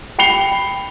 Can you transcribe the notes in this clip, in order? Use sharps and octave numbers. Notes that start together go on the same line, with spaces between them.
G5 B5 C7 C#7 F7 G7